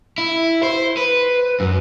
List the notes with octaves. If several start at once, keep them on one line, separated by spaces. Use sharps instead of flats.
E4
C5
B4
F#2